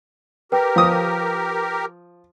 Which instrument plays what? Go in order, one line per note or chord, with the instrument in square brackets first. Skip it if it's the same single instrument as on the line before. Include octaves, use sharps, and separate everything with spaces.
[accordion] G4 A#4 [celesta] B4 G5
[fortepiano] F3 D#6